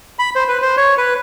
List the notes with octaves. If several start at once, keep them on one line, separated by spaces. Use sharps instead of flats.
B5
C5
B4
C5
C#5
B4